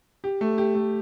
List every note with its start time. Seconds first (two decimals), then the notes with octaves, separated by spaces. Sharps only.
0.24 G4
0.41 A3
0.58 G4
0.75 A3